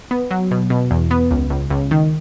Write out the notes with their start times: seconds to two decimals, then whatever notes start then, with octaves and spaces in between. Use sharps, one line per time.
0.11 B3
0.31 F#3
0.51 B2
0.70 B2
0.91 E2
1.11 B3
1.31 C#2
1.50 C#2
1.70 C#2
1.91 D#3